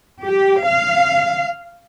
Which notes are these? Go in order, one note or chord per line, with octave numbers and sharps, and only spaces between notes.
G4
F5